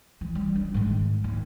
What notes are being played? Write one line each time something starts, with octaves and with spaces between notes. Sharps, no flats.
E3
G3
D4
G#2 D#3
D#2